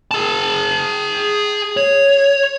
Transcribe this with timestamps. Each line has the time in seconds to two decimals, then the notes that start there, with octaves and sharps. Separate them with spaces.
0.11 G#4 A5
1.77 C#5